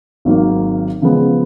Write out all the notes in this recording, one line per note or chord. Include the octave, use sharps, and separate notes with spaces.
G#1 G#2 D#3 F#3 A#3
C#3 F3 G#3 B3